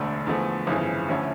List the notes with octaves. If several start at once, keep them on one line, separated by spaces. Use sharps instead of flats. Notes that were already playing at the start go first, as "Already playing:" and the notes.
Already playing: E1 D2 D3 A3 D4
E2 D3 F3 A3
G1 F2 C#3 E3
D2 D3 F3 C#4 E4